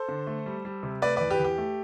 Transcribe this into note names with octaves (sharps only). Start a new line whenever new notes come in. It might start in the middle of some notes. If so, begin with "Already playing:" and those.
Already playing: A4 C5
D3
A3
G3
G3
C3
A3 B4 D5
E2 B4 D5
G4 B4
E2
G4
A3